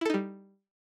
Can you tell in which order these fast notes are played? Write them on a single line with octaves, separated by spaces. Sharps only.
E4 A4 D#4 G3